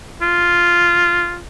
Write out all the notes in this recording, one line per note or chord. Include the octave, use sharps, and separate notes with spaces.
F4